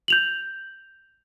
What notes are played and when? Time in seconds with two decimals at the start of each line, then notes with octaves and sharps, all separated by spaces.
0.08 G6 F7 F#7